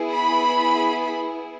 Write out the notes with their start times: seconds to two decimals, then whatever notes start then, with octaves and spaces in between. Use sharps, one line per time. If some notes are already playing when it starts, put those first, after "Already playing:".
Already playing: B3 E4 G#4
0.12 B5